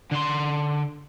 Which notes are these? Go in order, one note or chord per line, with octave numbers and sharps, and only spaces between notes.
D3 C6